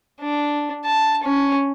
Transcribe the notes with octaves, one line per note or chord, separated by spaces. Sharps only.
D4
A5
C#4